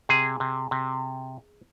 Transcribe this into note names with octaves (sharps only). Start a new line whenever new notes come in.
C3 G#4
C3
C3